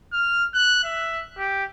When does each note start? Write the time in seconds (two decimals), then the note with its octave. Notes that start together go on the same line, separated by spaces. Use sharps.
0.13 F6
0.54 F#6
0.84 E5
1.38 G4